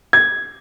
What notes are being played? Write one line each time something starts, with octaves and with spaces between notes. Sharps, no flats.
G#6